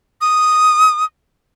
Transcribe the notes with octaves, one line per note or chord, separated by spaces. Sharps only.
D#6